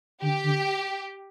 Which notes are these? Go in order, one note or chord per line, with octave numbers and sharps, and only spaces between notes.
D3 G4
D3